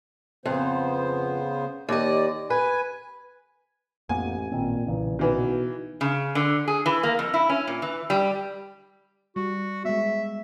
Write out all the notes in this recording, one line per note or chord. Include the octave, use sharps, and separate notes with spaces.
F2 C#3 B3 C5
D#2 D5 D#5
B4 G#5
A1 F2 A#3 B3 G#5
A1 A#2 D#3 C4
B1 A#2 C#3 E3
B2 D#3 E3 B3
C#3
D3
G#4
E3
A#3
F2
E4
C#4
A#2
E3
G3
G3 F#4
G#3 B3 E5